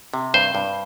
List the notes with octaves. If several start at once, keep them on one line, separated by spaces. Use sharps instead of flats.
C3
G2 C5
G2